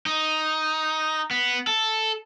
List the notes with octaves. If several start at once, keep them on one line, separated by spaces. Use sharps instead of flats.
D#4
B3
A4